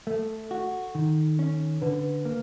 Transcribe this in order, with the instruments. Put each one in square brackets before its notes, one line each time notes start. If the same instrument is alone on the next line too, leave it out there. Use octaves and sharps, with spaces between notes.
[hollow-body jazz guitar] A3 [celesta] A4
[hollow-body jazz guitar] F#4
D#3
C#4
[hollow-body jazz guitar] D3 [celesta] B4
[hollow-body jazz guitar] A#3